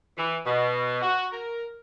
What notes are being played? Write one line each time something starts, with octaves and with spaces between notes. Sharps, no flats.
E3
B2
F#4
A#4